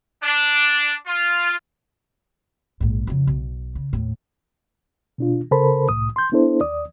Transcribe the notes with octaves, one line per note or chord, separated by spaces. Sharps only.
D4
F4
A#1 G#2
F2 C#3
B1
C#3
D#2 A2
B2 D4 F4
C#3 A4 A#4 C5 A5 B5
C2 A2 D#6
C6 G6
B3 D4 E4 A4 C5
D#2 D5 D#6